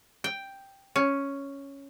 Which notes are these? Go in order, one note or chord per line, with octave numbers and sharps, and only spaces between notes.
G5
C#4